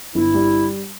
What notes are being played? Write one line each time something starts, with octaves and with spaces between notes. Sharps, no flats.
G1 E4
G3